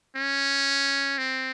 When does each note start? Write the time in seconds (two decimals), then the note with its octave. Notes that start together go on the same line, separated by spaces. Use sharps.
0.16 C#4
1.18 C4